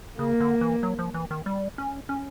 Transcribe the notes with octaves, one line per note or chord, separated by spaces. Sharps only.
C#3 A#3
D3
E3
F#3
F3
E3
D#3
G3
C#4
C#4